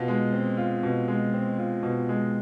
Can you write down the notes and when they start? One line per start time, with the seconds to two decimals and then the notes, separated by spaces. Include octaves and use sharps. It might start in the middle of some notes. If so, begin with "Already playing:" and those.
Already playing: B2 F4
0.08 G#3
0.33 C4
0.57 F4
0.83 B2
1.08 G#3
1.34 C4
1.58 F4
1.83 B2
2.09 G#3